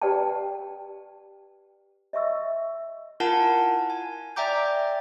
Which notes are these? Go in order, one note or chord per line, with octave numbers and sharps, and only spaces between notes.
G4 B4 D5 F#5 G5 A5
D#5 E5 C#6 E6
E4 F4 A#4 F#5 G#5 A5
G#5
D5 E5 G5 A#5 D6 G6